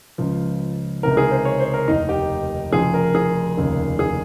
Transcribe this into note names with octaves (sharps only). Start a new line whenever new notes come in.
C#2 C#3 F3
C#2 C3 D#3 A#4
G#4
C5
C#5
C5
A#4
F1 D#2 D#3 D#4
G4
F1 F2 C#3 F3 G#4
A#4
G#4
F1 D#2 C#3
G#4